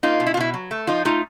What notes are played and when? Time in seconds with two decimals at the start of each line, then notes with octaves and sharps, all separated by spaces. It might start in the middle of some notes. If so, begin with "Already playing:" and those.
0.03 A#3 D#4 F4
0.20 B2
0.26 E4
0.34 F4
0.37 B2 E4
0.54 F#3
0.71 A3
0.87 F3 D#4 F4
1.05 A3 D#4 F4